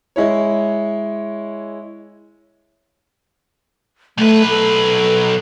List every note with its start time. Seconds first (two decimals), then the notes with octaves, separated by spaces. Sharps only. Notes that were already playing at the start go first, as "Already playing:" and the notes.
0.16 G#3 E4 C#5
4.18 B1 A3 B4
4.49 A4